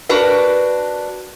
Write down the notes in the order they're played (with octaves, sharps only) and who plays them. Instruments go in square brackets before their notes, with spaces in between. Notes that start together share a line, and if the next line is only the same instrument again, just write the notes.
[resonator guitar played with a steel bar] D4 F#4 A#4 B4